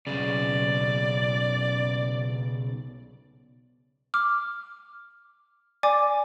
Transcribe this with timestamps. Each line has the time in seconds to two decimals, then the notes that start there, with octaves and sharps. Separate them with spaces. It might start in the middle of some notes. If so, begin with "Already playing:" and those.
0.07 B1 C#3 D5
4.14 D6 F6
5.83 D5 G#5 D6